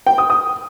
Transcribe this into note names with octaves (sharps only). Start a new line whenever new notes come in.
G5
D#6
D#6